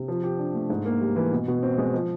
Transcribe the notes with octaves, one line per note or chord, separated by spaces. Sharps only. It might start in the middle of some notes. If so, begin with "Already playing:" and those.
Already playing: C3
F3
G4
D4
A3
G#2
A#3
G3
E3
B2
B2
C4
G#3
F3